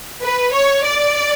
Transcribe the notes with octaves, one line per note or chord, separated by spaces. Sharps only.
B4
C#5
D5